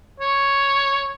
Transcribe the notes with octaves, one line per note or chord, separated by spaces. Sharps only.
C#5